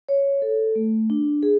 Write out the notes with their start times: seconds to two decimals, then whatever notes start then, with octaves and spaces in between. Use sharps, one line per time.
0.09 C#5
0.42 A4
0.76 A3
1.10 D4
1.43 G#4